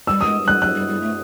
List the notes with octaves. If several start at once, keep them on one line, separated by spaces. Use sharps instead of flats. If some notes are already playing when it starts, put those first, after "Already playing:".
G3 E6
G#3 D#6
G3 F#6
F#3 F#6
G3
G3
A3